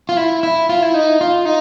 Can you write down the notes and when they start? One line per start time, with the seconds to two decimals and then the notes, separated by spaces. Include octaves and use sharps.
0.09 F4
0.17 E4
0.43 E4
0.69 F4
0.82 E4
0.94 D#4
1.21 F4
1.45 D#4